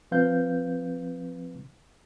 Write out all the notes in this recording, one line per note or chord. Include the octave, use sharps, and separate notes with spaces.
F3 C4 B4 F5 G6